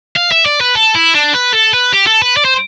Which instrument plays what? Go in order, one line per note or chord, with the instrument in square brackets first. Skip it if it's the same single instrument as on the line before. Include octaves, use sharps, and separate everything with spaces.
[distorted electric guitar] F5
E5
D5
B4
A4
E4
D4
B4
A4
B4
G4
A4
B4
D5
C5